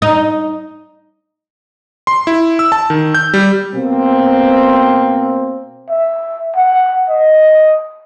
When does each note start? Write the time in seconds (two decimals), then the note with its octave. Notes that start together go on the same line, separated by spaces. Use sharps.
0.02 D#4
2.07 C6
2.27 E4
2.59 E6
2.72 A5
2.90 D#3
3.14 G6
3.34 G3
3.75 B2 A#3 C4
5.89 E5
6.56 F#5
7.09 D#5